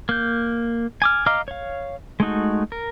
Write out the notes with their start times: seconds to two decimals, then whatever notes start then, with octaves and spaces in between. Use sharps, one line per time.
0.09 A#3 G6
1.02 G#5 D6 F6
1.26 D#5 F5 A#5 D6 F6
1.48 C#5 F5
2.20 G#3 A3 D#4 F#4
2.72 A#4